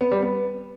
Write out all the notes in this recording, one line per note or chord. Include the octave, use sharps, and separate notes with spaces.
B3
G3
B3